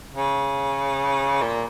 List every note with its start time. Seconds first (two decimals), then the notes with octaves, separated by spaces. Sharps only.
0.13 C#3
1.41 A#2